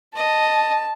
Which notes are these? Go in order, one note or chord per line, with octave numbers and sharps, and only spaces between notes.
D#5 A5